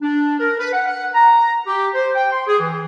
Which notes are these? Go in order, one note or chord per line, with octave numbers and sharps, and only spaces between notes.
D4
A#4
B4
F#5
F#5
A#5
G4
C5
G5
C6
G#4
E3